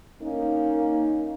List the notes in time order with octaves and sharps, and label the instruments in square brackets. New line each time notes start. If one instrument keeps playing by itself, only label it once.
[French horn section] A#3 C#4 D#4